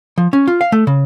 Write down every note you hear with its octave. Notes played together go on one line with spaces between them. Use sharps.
F3
C#4
F4
F5
A3
C#3